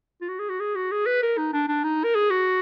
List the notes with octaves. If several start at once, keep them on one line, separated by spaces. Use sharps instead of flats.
F4
F#4
G#4
F#4
G#4
F#4
G#4
B4
A#4
D#4
D4
D4
D#4
A#4
G#4
F#4